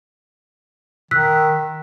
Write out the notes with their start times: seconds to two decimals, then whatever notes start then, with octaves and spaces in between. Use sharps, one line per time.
1.11 D#3 E6 F#6 B6
1.57 D#3